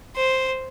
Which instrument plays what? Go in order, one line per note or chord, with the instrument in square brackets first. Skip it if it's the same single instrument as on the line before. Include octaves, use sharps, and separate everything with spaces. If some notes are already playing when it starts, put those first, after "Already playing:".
[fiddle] C5